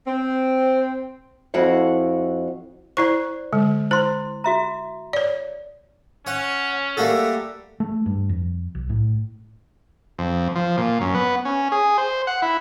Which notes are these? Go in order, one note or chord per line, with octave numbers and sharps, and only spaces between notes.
C4
F2 E4 F#4 F5 F#5
E4 C5 D5 C#6
D3 G#3
E4 C5 C6
F#4 E5 A#5
C#5 D5
C#4 C#5 F#5
G3 A3 A#3 F#4 G4 A4
A3
G2
F2
B1
A2
F2
F3
A#2
F#2
B3
C#4
G#4
C5
F#5
E4